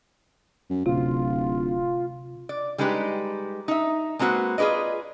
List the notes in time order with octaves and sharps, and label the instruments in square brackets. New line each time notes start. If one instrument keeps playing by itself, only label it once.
[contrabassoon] F#2
[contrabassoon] D1 [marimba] C3 [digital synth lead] F4
[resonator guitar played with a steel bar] D5
G3 G#3 D#4 G4 A4 B4
D#4 E5
G#3 A#3 C4 F#4 B4
F4 G#4 B4 D5 D#5